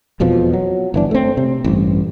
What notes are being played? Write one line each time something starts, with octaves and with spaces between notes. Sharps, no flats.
E1 F2 B2 F3
F#3
G1 E3 D4
A3 C4
C3
A1 G2